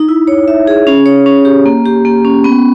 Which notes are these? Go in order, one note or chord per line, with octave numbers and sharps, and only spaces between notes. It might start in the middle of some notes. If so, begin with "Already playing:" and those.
Already playing: D#4
E4
C#5
E5
G#4
C#4
C#5
C#4
G4
A#3
G4
A#3
C#4
B3